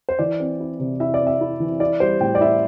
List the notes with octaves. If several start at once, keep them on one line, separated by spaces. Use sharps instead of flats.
C5
E3 D5
C4
E4
C3
E4 E5
D5
C4
E5
E4
E3
E4 D5
G3 C5
A2 G5
D5
E4 E5